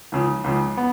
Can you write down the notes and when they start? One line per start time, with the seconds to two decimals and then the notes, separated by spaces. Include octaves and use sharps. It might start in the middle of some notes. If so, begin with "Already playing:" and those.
0.12 C#2 C#3 F3
0.44 C#2 C#3 F3
0.77 B3